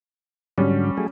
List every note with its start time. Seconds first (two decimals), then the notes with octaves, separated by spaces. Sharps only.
0.58 G#2 D3 F#3 G3 C#4
0.97 F#3 A3 G#4